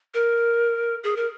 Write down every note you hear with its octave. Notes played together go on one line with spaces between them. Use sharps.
A#4
G#4
A#4